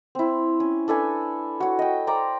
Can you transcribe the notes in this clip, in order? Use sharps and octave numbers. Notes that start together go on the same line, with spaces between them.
C4 E4
C#4
D4 A4 B4 G#5
F#4 C#5
D#5 G5
C5 D5 G5 A#5